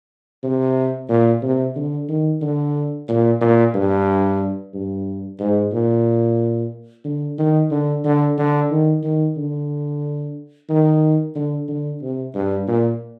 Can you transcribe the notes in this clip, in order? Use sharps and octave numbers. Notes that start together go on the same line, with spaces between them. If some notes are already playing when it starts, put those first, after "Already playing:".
C3
A#2
C3
D3
D#3
D3
A#2
A#2
G2
G2
G#2
A#2
D3
D#3
D3
D3
D3
D#3
D#3
D3
D#3
D3
D3
C3
G2
A#2